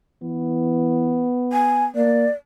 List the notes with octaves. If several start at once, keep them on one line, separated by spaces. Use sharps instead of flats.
E3 B3
G#5
A#3 D5